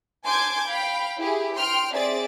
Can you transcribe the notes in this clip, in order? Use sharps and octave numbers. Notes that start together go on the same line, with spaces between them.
G#5 A5 C6 D6 G6 G#6
F5 G5 B5
E4 G4 G#4
G5 C6 F6
C4 G#4 D5 E5 A6